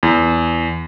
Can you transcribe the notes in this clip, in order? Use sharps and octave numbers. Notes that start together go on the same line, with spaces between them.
E2